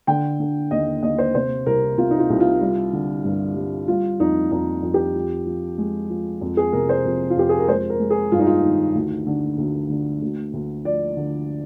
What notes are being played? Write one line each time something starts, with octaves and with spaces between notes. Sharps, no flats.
D3 G5
D3
D#2 D#5
D#2 D#5
C5
C3 C5
C2 A#4
C3 F4
D#4
F4
C2
F4
G3
D3
G2
G3
G3 F4
F2 D#4
F2 D#4
F2
G4
F3
F3
G#3
F3
F2
G#4
C3 A#4
C5
F2
F4
F2 G4
G#4
A#4
G#3 C5
A#4
G#3
G#4
G2 F4
D#4
F4
D#3
D2
D3
D2
D3
D2
D2
F3 D5
D3